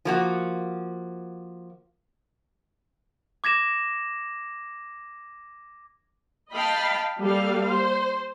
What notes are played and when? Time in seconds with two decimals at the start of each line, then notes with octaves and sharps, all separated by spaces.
0.05 F3 A#3 F#4
3.44 D6 G#6 A#6 E7
6.54 D#5 F5 G5 A5 B5
7.21 G3 A#3 A4 F5
7.66 C5